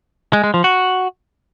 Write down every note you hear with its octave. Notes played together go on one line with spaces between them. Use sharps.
G#3
G#3
F3
F#4